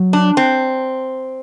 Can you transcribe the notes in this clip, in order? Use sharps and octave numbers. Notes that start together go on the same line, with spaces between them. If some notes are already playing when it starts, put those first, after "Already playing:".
Already playing: F#3
D4
C4